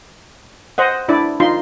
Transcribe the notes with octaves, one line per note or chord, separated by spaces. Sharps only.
C5 D#5 F#5
D4 E4 D5
D#4 F4 C6